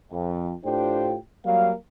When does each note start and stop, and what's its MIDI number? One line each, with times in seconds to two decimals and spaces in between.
0.12 0.53 41
0.65 1.16 45
0.65 1.16 62
0.65 1.16 65
0.65 1.16 67
0.65 1.16 72
0.65 1.16 79
1.46 1.73 54
1.46 1.73 55
1.46 1.73 58
1.46 1.73 77